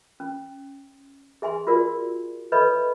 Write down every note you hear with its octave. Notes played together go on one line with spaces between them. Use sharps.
C#4
G#4 E5 G#5 C6
F4 F#4 A#4 D5
A4 B4 C#5 D#5 E5 B5